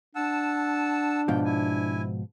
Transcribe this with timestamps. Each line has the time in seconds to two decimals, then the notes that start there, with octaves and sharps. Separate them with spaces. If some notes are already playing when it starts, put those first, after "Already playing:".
0.16 D4 F#5 A5 E6
1.28 G#2 B2 F3 G5
1.45 E4 G#5